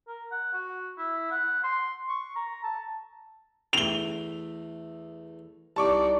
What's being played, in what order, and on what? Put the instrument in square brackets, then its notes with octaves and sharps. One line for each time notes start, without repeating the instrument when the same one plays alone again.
[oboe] A#4
F#5
F#4
E4
F#5
C6
C#6
A#5
A5
[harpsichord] E2 A3 [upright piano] F7 G7
[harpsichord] C2 [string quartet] D#4 D5 [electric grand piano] A5 C#6 D6